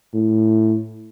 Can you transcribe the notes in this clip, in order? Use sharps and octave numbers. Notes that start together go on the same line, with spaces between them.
A2